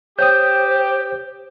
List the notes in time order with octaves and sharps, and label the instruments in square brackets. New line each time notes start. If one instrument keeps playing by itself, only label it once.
[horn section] G4 [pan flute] C5 [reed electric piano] C#5 G5 D#6 [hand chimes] G6